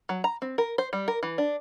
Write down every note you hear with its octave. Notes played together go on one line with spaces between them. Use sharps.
F#3
A#5
C4
A#4
C5
G3
A#4
E3
D4